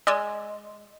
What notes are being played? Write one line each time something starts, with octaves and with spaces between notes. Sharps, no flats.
G#3 D5 D#6 E6